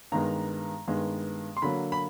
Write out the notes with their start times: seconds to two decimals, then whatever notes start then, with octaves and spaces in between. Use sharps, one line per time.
0.12 G2 D#3 G#3 B3 A#5
0.87 G2 D#3 G#3 B3
1.57 C6
1.62 D3 F#3 A#3 B5
1.92 B5